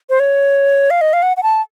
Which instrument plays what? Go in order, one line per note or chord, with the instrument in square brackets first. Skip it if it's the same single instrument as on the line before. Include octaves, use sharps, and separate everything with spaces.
[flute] C5
C#5
F5
D#5
F5
F#5
F#5
A5